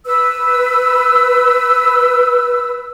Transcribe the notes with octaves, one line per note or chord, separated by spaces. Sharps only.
B4 E6